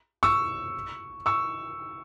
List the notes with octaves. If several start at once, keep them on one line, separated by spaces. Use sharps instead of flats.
C#6 E6
C#6 E6